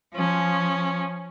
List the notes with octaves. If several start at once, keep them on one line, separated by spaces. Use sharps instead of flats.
F3 C#4